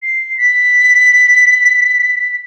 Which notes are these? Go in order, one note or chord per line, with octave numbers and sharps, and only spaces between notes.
C7
B6